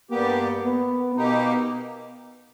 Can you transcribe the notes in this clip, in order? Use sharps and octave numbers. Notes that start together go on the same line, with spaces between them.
G2 G3 A#3 B3 G4
B3
B2 A#3 B3 D#4 G4